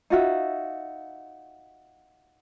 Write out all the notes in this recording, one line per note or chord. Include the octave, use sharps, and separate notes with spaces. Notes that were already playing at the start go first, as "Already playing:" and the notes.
D#4 F4 F#4 E5